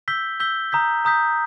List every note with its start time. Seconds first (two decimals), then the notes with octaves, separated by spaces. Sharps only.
0.08 E6 G6 B6 G7
0.40 E6 G6 B6 G7
0.72 A#5 D#6 G6 B6
1.05 A#5 D#6 G6 B6